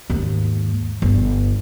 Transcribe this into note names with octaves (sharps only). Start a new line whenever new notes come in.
D#2 G#2
G1